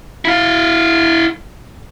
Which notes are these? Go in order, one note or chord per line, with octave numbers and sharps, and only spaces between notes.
E4 F5